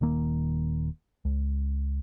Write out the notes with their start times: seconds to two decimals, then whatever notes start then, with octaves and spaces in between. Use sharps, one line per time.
0.01 D#1 D#3 A#3
1.25 C#2